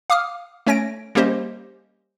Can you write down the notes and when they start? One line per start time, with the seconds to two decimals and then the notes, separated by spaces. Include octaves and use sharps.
0.10 F5 D6 D#6 F6
0.67 A3 C#4 C#5 G#5 A#6 D7
1.15 G3 A#3 C#4 G4 C5 D#5